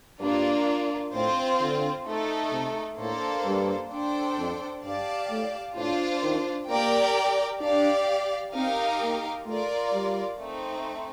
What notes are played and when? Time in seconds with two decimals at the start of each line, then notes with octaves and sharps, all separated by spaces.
0.20 G2 A#3 D4 F4
1.13 A2 C4 F4 C5
1.60 D3
2.06 A3 D#4 A4
2.52 C3
2.98 A2 A#3 D4 A4 C5
3.45 G2
3.91 D4 A4 C5 G5
4.38 F2
4.83 G2 G4 D5 F5 A5
5.30 A2
5.76 A2 D4 F4 C5
6.23 D#3
6.69 A#3 G4 A#4 D5 G5
7.61 D4 G4 D5 F5
8.54 C4 D#4 G4 A#4 F5
9.01 A#3
9.46 A3 F4 A#4 D5
9.93 G3
10.39 A3 C4 D#4